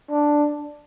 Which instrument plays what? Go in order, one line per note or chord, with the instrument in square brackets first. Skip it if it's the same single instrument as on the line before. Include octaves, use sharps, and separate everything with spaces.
[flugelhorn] D4